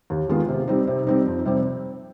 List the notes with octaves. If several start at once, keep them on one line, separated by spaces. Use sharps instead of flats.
D#2
D#3 G#3 B3 F4
C3
G3 C4 D#4
C3
G3 C4 D#4
F2
C3 G3 C4